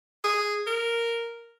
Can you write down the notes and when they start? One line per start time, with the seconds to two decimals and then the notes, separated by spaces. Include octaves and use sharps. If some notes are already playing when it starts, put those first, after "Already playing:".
0.24 G#4
0.67 A#4